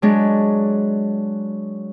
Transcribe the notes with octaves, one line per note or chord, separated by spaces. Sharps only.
F#3 G#3 D4